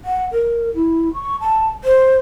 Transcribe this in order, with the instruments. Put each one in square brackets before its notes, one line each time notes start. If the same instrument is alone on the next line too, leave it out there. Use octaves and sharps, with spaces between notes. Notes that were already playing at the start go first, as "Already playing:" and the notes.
[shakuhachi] F#5
A#4
E4
C#6
A5
C5